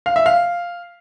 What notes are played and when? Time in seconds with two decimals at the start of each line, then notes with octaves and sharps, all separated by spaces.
0.06 F5
0.16 E5
0.26 F5